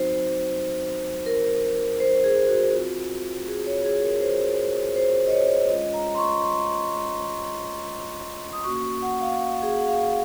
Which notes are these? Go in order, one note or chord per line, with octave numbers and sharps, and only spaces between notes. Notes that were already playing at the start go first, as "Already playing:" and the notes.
Already playing: F#3 C4 D#4 F#4 C5
A#4
C5
G#4
F#4
C4 F4
G#4
C#5
G#4
A#4
C5
C5
D#5
C#5
G#3 C#4 F4 D#5
A#5
C6
C#6
C6
D#6
A#3 C#4 F#4 C#6
F#5
F5
G#4
F#5
F5